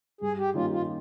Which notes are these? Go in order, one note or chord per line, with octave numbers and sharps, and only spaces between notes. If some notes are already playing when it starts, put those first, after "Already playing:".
G2 G#4
G4
D#3 G3 A#3 C#4 F4
F4